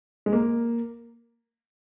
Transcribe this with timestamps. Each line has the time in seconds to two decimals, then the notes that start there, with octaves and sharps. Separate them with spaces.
0.26 G#3
0.33 A#3